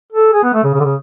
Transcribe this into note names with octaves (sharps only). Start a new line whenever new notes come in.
A4
G#4
B3
A3
C#3
C#3
D3
C#3